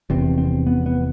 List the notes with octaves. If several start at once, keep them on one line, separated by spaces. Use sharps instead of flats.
F1 E2 C3 C4
C4
B3
B3